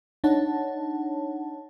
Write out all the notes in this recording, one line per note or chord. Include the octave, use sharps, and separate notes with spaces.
D4 D#4 C#5 F#5 A5